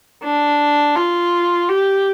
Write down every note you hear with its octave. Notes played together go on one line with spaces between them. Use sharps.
D4
F4
G4